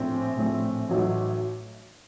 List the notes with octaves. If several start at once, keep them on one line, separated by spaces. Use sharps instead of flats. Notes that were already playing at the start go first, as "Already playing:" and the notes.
Already playing: A#1 A2 A3 C4
A#1 A2 A3 C4
A1 A2 F#3 A3 D#4